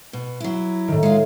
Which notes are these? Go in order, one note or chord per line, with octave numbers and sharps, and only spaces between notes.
B2
F#3 E4
A2 D#3
G#3 F4